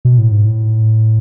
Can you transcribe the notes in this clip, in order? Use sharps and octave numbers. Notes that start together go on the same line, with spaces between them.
B2
A2
G#2
A2